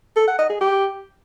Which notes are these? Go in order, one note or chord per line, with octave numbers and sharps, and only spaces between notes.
A4
F#5
D#5
G#4
G4